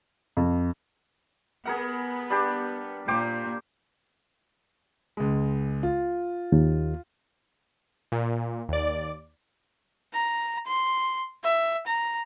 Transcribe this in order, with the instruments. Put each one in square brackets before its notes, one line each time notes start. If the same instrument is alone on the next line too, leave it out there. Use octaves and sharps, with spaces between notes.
[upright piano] F2
[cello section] B3 [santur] G#4 A#4 F#5
[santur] G3 D4 G4
[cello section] A#2 [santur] C5 G5 D6
[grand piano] C#2 G#3
F4
[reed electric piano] D#2
[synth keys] A#2
D#2 D5
[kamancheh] A#5
C6
E5
A#5